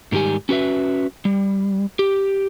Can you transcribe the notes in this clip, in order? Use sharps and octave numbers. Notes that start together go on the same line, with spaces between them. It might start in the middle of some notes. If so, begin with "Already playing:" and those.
G#2 D#3 G3 G4 G#5
C#4 F#4 B4 E5
G3
G4